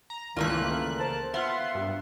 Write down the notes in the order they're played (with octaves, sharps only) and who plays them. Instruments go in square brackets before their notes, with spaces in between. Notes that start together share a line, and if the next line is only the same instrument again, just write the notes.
[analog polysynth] A#5
[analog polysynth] C#2 A#3 F#6 [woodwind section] G2 D#3 [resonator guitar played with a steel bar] E3 A3 F4
[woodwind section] A#4 C5 A5
[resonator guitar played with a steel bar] B3 [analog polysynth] F4 F#5 C6 [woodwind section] E5
[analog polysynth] G2